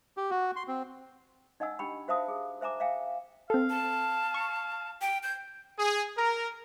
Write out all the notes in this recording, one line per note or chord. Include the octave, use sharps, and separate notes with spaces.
G4
F#4
C6
C4
D#4 D#5 F#5 G#5 E6
D4 G4 G5 B5
F#4 C5 E5 F5 A5 D#6
G#4
C5 E5 G#5 A#5 D6
E5 F5 G5 G#5
C4 A4 F5
A5
C#6
G5
G6
G#4
A#4